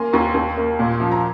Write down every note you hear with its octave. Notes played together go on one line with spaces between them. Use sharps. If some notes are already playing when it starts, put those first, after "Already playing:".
Already playing: A#3 G#5 C6
D#2 A#5 C#6
D#2
A#3
A#2
F3
A#5